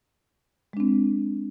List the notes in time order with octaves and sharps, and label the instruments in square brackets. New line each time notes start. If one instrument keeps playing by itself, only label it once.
[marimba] G#3
D4
C4